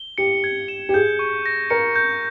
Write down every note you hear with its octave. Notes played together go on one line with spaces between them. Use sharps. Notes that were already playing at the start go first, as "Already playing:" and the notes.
Already playing: G7
G4 C#7
G#6
E7
G4
G#4 G6
C#6
A#6
A#4 C#7
G6